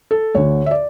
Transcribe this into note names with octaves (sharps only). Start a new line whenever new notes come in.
A4
D2 D3 C#5
E5
D5